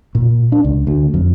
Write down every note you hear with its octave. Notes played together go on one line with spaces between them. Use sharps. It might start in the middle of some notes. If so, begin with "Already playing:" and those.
A#2
D4
C#2
D2
F2